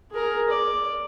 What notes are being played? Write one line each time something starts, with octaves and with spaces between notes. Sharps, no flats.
G#4 A#4
D5